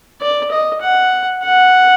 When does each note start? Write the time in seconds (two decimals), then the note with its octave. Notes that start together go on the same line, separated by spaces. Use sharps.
0.21 D5
0.51 D#5
0.81 F#5
1.43 F#5